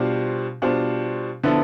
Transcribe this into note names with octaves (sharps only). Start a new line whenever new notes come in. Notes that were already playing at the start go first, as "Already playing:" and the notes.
Already playing: B2 G3 D4 F4 C5
B2 G3 D4 F4 C5
D3 F3 B3 E4 A4